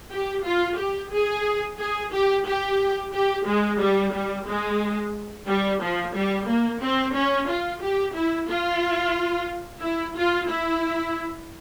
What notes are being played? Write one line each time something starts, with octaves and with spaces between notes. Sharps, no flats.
G4
F4
G4
G#4
G#4
G4
G4
G4
G#3
G3
G3
G#3
G3
F3
G3
A#3
C4
C#4
F4
G4
E4
F4
E4
F4
E4